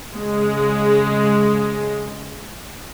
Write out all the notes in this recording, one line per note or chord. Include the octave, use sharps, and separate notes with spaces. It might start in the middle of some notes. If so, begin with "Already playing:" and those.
C#3 G#3